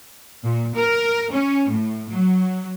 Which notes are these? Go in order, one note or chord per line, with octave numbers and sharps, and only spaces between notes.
A#2
A#4
C#4
A2
F#3